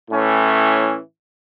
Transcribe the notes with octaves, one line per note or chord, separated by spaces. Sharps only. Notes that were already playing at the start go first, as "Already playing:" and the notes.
A2 E3 C#4